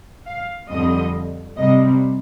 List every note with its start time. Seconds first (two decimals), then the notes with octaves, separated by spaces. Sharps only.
0.26 F5
0.69 F2 D3 G3 C4 D#5
1.56 C3 G3 C4 D#5